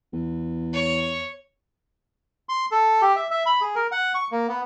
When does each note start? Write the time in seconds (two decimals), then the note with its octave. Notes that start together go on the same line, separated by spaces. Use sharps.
0.13 E2
0.73 C#5
2.49 C6
2.71 A4
3.02 G4
3.16 E5
3.31 E5
3.46 B5
3.61 G#4
3.75 A#4
3.92 F#5
4.15 C#6
4.32 A#3
4.48 B3